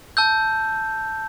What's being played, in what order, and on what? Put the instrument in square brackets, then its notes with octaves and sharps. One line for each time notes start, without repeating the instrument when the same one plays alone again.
[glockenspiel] A5 E6 G6